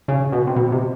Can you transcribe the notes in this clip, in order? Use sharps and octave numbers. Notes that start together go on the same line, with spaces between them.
C#3
B2
C3
B2
C3